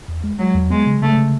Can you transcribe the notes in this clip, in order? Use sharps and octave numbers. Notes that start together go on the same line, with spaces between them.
E2
G#3
F#3 G#3
E2
G#3 B3
C#3
C#3 A3
C#3